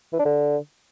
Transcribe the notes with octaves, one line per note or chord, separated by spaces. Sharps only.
E3
D4
D3